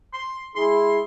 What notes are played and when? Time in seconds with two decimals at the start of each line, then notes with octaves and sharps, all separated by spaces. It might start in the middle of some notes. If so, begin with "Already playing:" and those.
0.13 C6
0.56 G#3 E4 G#4 C6